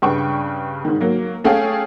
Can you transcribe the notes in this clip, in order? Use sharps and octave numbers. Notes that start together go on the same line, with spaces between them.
G2 C#3 B4 G5 C#6
G#2 D#3
F#3 A#3
A3 C#4 G#4 A4 F5 G5